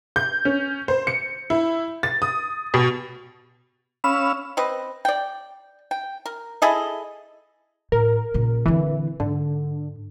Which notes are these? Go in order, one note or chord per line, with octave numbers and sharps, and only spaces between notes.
G6
C#4
C5
C#7
E4
A6
D#6
B2
C#4 F5 B5 E6
C4 B4 D#5
D5 G5
G5
A#4
E4 G#4 A4 D#5
A2 A#4
A#2 C#3
D3 E3 C4
G#2 D3